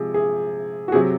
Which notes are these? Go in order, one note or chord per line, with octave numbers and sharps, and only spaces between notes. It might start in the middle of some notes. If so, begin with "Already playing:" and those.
Already playing: C3 F3 G#3 G#4
G#4
F#4
C3 F#3 G#4